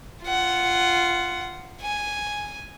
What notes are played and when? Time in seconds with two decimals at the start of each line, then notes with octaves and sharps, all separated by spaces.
0.25 F4 F#5
1.81 G#5